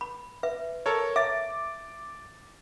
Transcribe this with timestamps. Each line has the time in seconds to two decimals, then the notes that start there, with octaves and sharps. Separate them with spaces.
0.01 B5
0.43 B4 E5
0.86 A4 A#4 C#5
1.16 E5 D6 A6